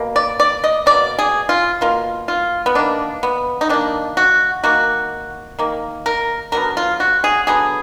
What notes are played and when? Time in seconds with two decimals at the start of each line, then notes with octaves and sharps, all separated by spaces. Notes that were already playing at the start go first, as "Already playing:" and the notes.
Already playing: B2 A#3
0.16 D5
0.40 D5
0.64 D#5
0.86 B2 A#3 D5
1.19 G#4
1.49 F4
1.81 B2 A#3 F4
2.28 F4
2.66 B3
2.75 D#3 A#3 D4
3.23 B3
3.61 D#4
3.69 D#3 A#3 D4
4.17 F#4
4.64 D#3 A#3 F#4
5.59 D#3 A#3
6.06 A#4
6.52 D3 F#3 B3 A#4
6.77 F4
7.00 F#4
7.24 G#4
7.47 D3 F#3 B3 G#4